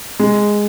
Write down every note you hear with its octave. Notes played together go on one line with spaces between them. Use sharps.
G#3